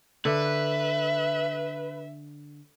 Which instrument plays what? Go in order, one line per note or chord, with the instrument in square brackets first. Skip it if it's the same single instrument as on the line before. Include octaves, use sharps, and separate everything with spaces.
[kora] D3 [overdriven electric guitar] B4 [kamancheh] E5